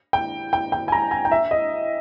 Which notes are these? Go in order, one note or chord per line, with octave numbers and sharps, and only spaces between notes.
G5
G5
G5
G#5
A#5
G#5
G5
E5
D#5